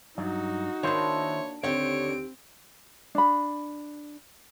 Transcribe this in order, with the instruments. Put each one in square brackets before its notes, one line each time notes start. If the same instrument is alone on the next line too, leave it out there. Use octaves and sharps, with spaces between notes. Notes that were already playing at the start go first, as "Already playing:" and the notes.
[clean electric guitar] G2 F#3 [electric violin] D#4 F#4
[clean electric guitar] D#3 E4 C5 [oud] A#3 D4 [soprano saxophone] C#5
[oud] D#2 G4 [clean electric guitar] D3 [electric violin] C4 D7 [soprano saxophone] C#5
[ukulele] D4 B5